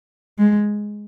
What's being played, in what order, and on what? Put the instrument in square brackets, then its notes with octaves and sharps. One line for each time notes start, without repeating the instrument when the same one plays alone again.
[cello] G#3